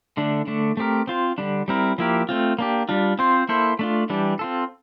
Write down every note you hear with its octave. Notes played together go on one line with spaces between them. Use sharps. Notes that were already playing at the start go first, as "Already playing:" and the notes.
D3 A3 D4
D3 A3 D4
A3 C4 G4 A#4
C4 F4 C5
D3 G3 D4
G3 C4 E4 A#4
F3 A#3 E4 G4 A#4
A3 C4 F4
A#3 D4 G4
G3 D4 F4
C4 F4 C5
A#3 E4 A4 C5
A3 D4 F4
E3 G3 D4 G4
C4 F4 A4